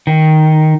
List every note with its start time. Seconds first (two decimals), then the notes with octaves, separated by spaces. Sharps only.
0.07 D#3